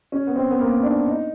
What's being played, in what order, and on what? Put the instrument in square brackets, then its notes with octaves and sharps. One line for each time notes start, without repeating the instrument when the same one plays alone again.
[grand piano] C#4
B3
C4
B3
A#3
D4
D#4